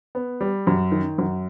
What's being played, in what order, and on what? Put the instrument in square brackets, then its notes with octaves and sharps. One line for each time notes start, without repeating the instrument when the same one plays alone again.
[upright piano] B3
G3
F#2
D#3
F#2